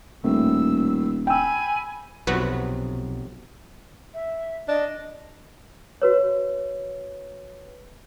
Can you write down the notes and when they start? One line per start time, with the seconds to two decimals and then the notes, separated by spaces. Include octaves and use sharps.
0.24 D#1 A2 E6
1.27 G5 G#5 B5 E6
2.27 B1 F2 C3 F#3 F#4 B4
4.14 E5
4.68 D4 D#5
6.02 F#4 B4 C#5